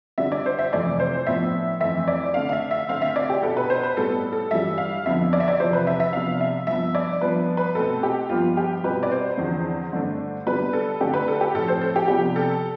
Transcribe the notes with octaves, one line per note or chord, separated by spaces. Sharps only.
D3 G3 D4 E5
D5
C5
E5
F2 C3 E3 A3 D5
C5
A2 F3 B3 D4 E5
F2 E3 A3 C4 E5
D5
D3 A3 D4 F5
F5
E5
E5
D3 A3 C4 F5
E5
D5
G4
B2 B3 D4 A4
B4
C5
B4
A2 G3 B3 A4
A4
G2 E3 G3 E5
F5
F2 D3 F3 B3 E5
D5
E5
D5
E2 C3 F3 C5
B4
E5
E5
C3 F3 B3 D4 F5
E5
G2 F3 B3 E5
D5
G2 F3 B3 D4 B4
B4
B2 A3 C4 A4
G4
G2 F3 B3 F4
G4
B2 G3 C4 B4
D5
C5
E2 D3 F3 C4
G2 D3 A3 D4
D3 G3 B3 D4 B4
A4
D3 A3 D4 G4
B4
A4
G4
A2 F3 C4 A4
C5
A4
G4
C3 F3 B3 D4 G4
A4